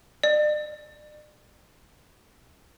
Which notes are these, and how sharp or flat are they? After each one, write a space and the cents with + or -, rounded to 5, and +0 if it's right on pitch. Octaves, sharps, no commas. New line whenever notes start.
D5 +40